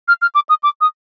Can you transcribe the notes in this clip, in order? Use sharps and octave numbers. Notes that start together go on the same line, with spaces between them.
F6
F6
D6
D#6
D6
D#6